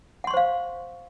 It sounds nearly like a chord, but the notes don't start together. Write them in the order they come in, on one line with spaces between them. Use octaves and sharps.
F#5 C6 C#6 C5 F5